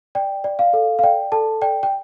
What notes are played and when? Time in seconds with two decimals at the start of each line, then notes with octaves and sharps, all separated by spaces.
0.15 D5 G5
0.44 D5
0.59 F5
0.73 A4
0.99 F5
1.03 D5 G5
1.32 A4 A5
1.62 D5 G5
1.83 G5